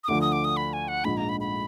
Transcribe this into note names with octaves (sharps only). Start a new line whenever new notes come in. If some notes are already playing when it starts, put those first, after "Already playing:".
D#6
D2 D3 F3 D6
D#6
D6
D#6
B5
G#5
F#5
A#1 G#2 F3 B5
A#5
B5
B5